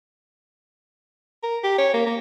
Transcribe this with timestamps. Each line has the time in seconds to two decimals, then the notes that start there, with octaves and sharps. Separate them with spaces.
1.43 A#4
1.64 G4
1.78 C#5
1.94 A#3
2.07 A#3